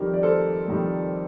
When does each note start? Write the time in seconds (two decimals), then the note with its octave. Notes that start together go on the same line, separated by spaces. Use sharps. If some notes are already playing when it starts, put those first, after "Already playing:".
Already playing: F2 D#3 G3 G4 A#4
0.14 D5
0.23 A4 C5
0.68 F2 D#3 G3